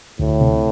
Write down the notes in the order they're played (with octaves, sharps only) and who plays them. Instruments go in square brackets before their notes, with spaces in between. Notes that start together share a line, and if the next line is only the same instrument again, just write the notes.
[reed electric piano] D2 [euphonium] A2
[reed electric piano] C3